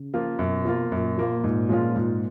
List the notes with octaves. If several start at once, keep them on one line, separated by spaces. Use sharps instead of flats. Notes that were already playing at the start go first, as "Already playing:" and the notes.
Already playing: C#3
F3 A#3 F4
F#2 B2
F3 A#3 F4
F#2 A#2
F3 A#3 F4
G#2
F3 G#3 C#4 F4
G#2